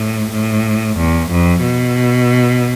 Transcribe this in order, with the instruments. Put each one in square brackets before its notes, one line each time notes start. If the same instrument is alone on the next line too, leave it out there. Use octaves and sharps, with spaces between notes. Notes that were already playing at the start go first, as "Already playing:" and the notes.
Already playing: [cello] A2
A2
E2
F2
B2